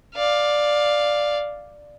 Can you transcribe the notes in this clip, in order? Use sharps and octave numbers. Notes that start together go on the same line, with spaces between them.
D5 F5